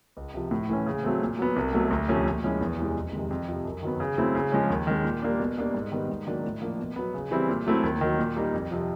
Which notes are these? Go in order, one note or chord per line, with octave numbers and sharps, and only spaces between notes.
C#2
C3 F3
A2
E3 A3 C#4
C#3
F#3 A3 C4
A#2
F#3 B3
C2
B2 F#3 A3
D2
C3 F3 A3 C#4
A#2
F3 G#3 C#4 E4
E2
C3 E3 G#3
F2
C3 D#3 G#3
F2
C3 F3
F#2
D#3 F#3 B3
C#3
F#3 A3 C4 E4
C#3
F3 G#3 C#4
D#2
D#3 G#3
A#2
G3 A#3 D4
B2
G3 A#3 D4
G#2
D#3 G3 B3
G#2
D#3 F#3 A#3 D4
A2
F3 A#3 D4
B2
F#3 B3
C#3
E3 G3 C4 E4
A#2
F#3 A3 C4 E4
D#2
D#3 F#3
A#2
G3 A#3 D#4
F2
C3 F3